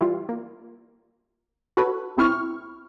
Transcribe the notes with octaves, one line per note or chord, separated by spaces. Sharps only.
E3 G3 F4
A#3
F#4 A4 B4 C#5
B1 A2 C4 E4 C#6 F6